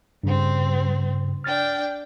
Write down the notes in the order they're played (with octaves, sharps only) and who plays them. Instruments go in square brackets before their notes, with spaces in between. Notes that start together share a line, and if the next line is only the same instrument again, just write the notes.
[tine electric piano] G2 C#3 [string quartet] G3 C4
[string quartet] D4 G5 [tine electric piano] F6 A6